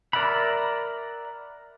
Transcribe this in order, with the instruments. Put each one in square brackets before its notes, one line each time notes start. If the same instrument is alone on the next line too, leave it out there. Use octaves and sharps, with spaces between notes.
[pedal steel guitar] A#4 D5 E5 F#5 B5